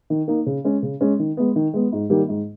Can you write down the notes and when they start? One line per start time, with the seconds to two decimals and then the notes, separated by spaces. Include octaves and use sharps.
0.10 D#3
0.28 A#3 D#4
0.46 C#3
0.64 G#3 C#4
0.83 C#3
1.01 G#3 C#4
1.19 D#3
1.37 G#3 B3
1.56 D#3
1.74 G#3 B3
1.92 G#2
2.10 D#3 G3 A#3
2.29 G#2